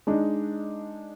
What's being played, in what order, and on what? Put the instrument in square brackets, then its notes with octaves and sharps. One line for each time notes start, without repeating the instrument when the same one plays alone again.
[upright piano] G#3 D4 D#4